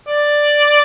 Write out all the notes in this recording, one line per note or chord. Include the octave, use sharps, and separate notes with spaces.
D5